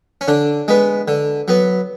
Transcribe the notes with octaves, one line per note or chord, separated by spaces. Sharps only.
C#4
D3 D4
G#3 B3
D3
F#3 B3